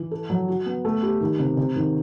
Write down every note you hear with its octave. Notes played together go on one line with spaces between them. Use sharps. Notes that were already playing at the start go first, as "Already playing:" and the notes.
Already playing: E3
A4
F#3
F#4
B3
A3
G4
D#3
C3
C3
D#3